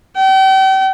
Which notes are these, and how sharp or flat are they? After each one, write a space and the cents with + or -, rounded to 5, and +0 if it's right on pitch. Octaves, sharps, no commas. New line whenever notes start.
G5 -40